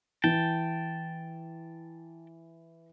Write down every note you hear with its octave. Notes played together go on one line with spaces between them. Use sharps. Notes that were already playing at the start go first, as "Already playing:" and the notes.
E3 G5 A5